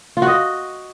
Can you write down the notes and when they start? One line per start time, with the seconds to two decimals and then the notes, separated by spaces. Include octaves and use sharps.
0.17 F4
0.22 F#4
0.27 D#5